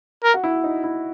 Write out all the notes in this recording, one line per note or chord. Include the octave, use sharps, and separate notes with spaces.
A#4
F#4
E4
D#4
E4